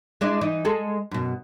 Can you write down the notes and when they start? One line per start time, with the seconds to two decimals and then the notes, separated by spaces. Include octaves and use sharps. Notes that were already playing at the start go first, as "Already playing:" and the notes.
0.21 G#3 D4 E4
0.41 E3 D#4
0.65 G#3 G#4 A4
1.11 F#2 B2